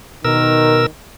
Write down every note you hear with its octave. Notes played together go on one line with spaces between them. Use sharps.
B2 D#3 A#4 E6